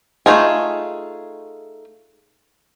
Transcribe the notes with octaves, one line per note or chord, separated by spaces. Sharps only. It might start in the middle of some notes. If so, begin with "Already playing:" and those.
A3 A#3 D#4 F4 G#4